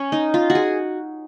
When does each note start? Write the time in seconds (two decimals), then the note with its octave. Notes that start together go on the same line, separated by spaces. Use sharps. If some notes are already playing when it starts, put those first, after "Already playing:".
Already playing: C#4
0.12 D#4
0.34 F4
0.50 F#4
0.55 G#4